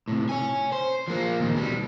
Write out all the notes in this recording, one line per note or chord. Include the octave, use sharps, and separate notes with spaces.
A2 C3
C#5 G#5
C5
F3 A#3
D#2 A#2
B2 G3